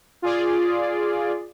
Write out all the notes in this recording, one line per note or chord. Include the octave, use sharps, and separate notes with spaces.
F4 G#4 D5